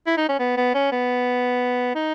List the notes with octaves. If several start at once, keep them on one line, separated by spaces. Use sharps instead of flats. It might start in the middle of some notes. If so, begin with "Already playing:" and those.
E4
D#4
C#4
B3
B3
C#4
B3
D#4